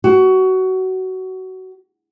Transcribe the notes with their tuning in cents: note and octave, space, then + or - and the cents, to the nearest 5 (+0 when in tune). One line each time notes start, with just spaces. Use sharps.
F#4 +20